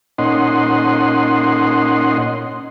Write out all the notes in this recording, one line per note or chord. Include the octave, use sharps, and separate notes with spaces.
A#2 C#4 D#4 D#5 F#5 C6